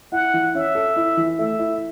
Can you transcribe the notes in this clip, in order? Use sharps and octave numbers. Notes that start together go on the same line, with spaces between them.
E4 F#5
E3
C#4 E5
A4
E4
E3
A3 E5
E4